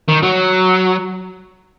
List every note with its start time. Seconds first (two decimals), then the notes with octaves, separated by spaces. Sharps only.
0.08 D#3
0.22 F#3